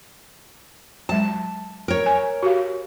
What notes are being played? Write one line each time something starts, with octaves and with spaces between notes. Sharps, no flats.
F#3 G#3 A5
A#4 C#5
G#5
F#4 G4 F5